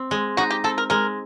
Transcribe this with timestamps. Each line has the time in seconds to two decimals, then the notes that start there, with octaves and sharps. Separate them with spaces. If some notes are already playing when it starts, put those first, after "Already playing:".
Already playing: C4
0.11 G#3
0.37 D#4 F#4
0.50 G4
0.64 C4 A4
0.78 A#4
0.90 G#3 A#4